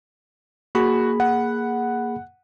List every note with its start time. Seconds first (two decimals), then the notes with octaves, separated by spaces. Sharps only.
0.75 A#3 F#4 G#4 B5
1.20 F#5